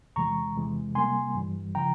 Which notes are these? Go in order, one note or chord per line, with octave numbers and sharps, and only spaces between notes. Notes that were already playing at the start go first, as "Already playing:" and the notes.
E2 C3 E3 G#3 A#5 C#6
E2 C3 E3 G#3
C3 G3 A#3 G#5 C6
G2 E3 G3
C#3 F3 G5 A#5